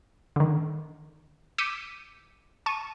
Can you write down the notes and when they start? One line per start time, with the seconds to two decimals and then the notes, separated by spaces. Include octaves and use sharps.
0.36 D3 D#3
1.58 D6 E6 G6 B6 C#7 D#7
2.66 A5 C#6 D#7